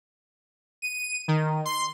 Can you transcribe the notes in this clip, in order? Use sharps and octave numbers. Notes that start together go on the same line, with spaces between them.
D#7
D#3
C6